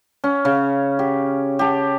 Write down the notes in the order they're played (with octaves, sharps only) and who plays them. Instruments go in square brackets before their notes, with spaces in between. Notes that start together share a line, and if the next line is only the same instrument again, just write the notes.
[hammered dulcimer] C#4
C#3
G4
G4 A5